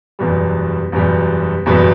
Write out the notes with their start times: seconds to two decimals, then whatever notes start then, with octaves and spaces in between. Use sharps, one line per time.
0.19 F#1 E2 B2 G3
0.92 F#1 E2 B2 G3
1.66 F#1 E2 B2 G3